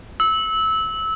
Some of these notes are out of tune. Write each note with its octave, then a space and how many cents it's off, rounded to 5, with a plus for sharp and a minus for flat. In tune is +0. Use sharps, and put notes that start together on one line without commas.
E6 -20